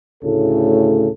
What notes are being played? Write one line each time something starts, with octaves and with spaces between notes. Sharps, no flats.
D2 A2 C#3 A4